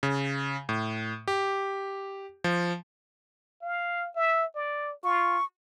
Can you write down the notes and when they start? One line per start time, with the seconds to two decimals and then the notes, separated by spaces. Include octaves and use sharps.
0.03 C#3
0.69 A2
1.28 G4
2.44 F3
3.62 F5
4.16 E5
4.55 D5
5.04 F4 C#6